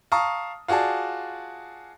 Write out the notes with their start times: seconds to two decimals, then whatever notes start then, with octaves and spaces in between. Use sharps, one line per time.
0.12 F5 A5 A#5 C#6 D#6
0.68 F4 F#4 G#4 D5 A5